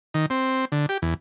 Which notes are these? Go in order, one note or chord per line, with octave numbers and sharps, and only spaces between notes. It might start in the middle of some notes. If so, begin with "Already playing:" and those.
D#3
C4
D3
G4
E2